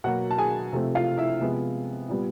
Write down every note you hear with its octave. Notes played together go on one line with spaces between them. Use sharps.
B2 F#3 A#3 F#4 F#5
A5
G#4 G#5
C3 F3 A3 C4
F4 F5
E4 E5
C3 F3 G#3 B3
A#2 G3 B3